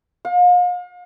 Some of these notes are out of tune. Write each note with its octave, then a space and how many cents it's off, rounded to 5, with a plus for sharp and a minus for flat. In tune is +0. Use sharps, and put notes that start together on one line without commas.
F5 +40